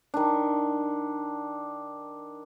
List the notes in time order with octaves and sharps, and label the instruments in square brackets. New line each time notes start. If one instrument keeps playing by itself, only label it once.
[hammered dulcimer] D#3 D4